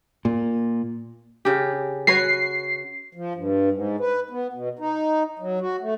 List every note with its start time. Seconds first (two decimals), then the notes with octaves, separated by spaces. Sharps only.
0.25 A#2
1.45 C#3 G4
2.07 F#4 B4 C#5 C7
3.15 F3
3.35 G2
3.72 G#2
4.00 B4
4.30 B3
4.53 B2
4.79 D#4
5.39 F#3
5.60 F#4
5.80 A3